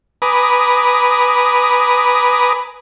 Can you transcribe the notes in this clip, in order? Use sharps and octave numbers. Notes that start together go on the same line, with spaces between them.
B4 G#5 A#5 B5 D6 D#6